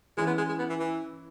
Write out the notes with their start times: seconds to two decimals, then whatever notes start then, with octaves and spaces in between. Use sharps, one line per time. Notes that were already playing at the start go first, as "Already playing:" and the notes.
0.17 E3 G#3 C#4 E4
0.27 B3
0.38 G#3
0.49 G#3
0.59 B3
0.70 E3
0.80 E3